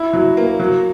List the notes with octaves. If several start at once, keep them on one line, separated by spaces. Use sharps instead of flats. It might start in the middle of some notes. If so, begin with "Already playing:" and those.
Already playing: E4
F#3
A#3
F#3